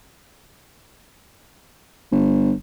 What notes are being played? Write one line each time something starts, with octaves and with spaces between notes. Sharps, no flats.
G1